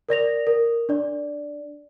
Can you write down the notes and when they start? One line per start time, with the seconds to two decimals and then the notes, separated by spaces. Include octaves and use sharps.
0.09 A#4 D5 A#6 F7
0.47 A#4
0.89 D4 D5